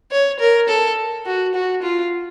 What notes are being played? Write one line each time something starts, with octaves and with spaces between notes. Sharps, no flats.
C#5
A#4
A4
F#4
F#4
F4